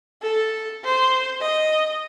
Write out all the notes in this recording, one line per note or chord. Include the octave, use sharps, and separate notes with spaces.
A4
C5
D#5